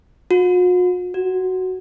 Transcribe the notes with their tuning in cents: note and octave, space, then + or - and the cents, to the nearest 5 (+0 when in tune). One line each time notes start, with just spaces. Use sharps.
F#4 -45
F#4 +5